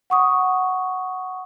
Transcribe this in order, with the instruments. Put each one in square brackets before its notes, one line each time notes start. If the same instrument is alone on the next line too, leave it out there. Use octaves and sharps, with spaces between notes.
[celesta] F#5 C#6 D#6